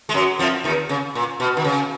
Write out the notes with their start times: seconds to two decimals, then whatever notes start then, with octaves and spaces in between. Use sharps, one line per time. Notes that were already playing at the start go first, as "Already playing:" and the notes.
0.09 G#3
0.14 F#2 F#3
0.39 F2 F3
0.64 D#2 D#3
0.89 C#3
1.15 A#2
1.40 B2
1.57 D#3
1.64 C#3